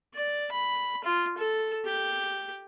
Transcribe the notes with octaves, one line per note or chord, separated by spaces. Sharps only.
D5
B5
F4
A4
G4